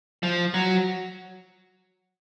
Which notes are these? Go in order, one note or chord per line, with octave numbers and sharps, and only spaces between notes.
F3
F#3